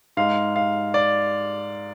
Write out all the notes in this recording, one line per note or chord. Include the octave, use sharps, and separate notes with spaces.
G#2 G#3 F5
F5
D5